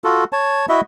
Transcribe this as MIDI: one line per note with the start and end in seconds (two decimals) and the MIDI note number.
0.04 0.24 65
0.04 0.24 66
0.04 0.24 69
0.33 0.66 73
0.33 0.66 81
0.69 0.81 64
0.69 0.81 66
0.69 0.81 75
0.69 0.81 76